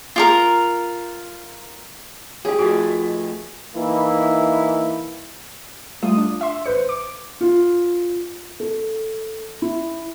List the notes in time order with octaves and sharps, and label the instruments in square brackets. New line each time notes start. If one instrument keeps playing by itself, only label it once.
[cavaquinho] F4 G4 A#4
[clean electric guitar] B1 G4 [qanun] G#4
[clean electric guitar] F2 F3 A3 [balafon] F#4
[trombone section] E3 A#3 D#4 E4
[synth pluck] G3 A3 F4 D#6
D4
E5 C6
A1 B4 C5 C#7
D6
[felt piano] F4
A4
E4